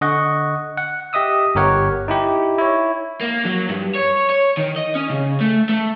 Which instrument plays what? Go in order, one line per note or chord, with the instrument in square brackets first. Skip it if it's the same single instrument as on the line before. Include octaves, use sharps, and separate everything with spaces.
[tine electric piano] D3 D#5 F#5 C#6
F#5
G4 D#5 E5 D#6 E6
G1 G4 A#4 C#5 F#5
D#4 E4 G4
E4 C#5
[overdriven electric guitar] A#3
F#3
G2
C#5
C#5
D#3
D#5
C#4
C#3
A3
A3